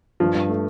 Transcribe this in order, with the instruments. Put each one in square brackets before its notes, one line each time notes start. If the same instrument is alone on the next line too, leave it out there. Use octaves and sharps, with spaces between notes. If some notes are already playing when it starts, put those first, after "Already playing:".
[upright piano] G2 [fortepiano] F3
[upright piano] G2
A3